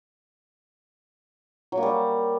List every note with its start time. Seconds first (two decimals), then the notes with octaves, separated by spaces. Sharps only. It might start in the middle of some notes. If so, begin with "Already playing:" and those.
1.72 F#3
1.77 A#3
1.83 G3